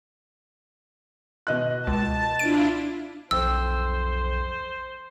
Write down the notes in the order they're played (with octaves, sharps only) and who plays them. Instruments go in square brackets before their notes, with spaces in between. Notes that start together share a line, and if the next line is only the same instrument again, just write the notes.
[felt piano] B2 D#5 F#6
[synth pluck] C#2 [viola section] A5
[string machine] D4 E4 F4 [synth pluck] D7
[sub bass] B1 [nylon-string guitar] F2 [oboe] C5 [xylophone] E6